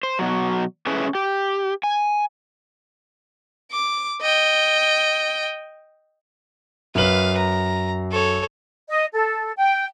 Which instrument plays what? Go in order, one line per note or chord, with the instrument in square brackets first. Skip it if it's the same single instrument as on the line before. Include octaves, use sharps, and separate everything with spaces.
[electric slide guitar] C5
B2 F#3
A3 C#4 E4 G#4 B4
G4
G#5
[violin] D6
D#5 G5
[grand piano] F#2 F#7 [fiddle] B4 F5
[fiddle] A#5
A4 C#5
[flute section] D#5
A4
G5